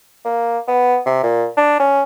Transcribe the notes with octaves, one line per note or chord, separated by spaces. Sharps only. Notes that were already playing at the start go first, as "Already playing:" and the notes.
A#3
B3
C3
A#2
D4
C#4